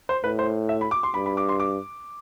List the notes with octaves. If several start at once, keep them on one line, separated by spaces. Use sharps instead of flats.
C5
A2 B4
C5
E5
B5
D6
C6
G2 B5
B5
D6
C6
D6